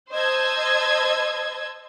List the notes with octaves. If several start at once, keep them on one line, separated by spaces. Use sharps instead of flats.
C5 D#5 A5 E6 G#6